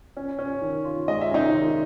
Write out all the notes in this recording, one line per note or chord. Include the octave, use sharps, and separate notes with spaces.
C#4
C#4
D#3
F4
G#3 D#5
E5
C#4 D#4 D#5
D#3